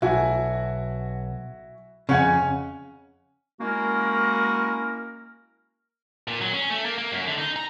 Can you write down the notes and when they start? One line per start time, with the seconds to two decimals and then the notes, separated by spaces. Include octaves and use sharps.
0.02 B1 E4 F#4 G#5
2.09 F2 C#3 C#4 F#5 G#5
3.61 G#3 A#3 C#4 E4 F#4 A#4
6.28 A#2
6.41 F#3
6.54 C#4
6.70 A3
6.85 A#3
6.98 A#3
7.12 F#2
7.27 D3
7.38 D#4
7.56 A#5